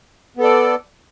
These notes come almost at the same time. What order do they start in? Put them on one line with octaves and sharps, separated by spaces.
B3 A4 D5